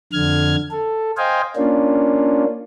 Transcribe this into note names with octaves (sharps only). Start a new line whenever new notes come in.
F2 D3 F6 G#6
A4
C5 D#5 F5 G5 G#5
A#3 C#4 D4 F4